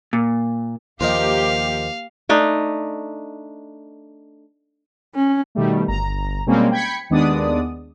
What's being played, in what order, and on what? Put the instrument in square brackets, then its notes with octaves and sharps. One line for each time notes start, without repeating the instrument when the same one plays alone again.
[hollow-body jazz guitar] A#2
[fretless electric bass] D#2 F3 [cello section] A#3 G4 [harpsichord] D#4 A#4 C5 [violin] F5
[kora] A3 D4 D#4
[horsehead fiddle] C#4
[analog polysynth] B2 D#3 G3 A3
G1 A#5
B2 G3 G#3 A#3 C4 C#4
G5 B5 G#6 B6 C#7
D#2 G#3 B3 D4 D5 D#6